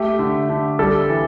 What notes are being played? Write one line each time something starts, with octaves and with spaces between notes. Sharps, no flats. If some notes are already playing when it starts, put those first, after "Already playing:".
Already playing: A3 G4
D3
D3
G3 A4
E3